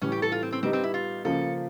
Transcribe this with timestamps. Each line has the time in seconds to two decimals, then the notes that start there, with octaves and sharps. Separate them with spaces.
0.02 A2 E3 G3 C#4
0.12 G4
0.22 A4
0.32 F4
0.42 C4
0.52 C4
0.63 G3 B3 C4 D#4 G4
0.73 C4
0.83 E4
0.94 F4
1.24 C#3 F3 A#3 A4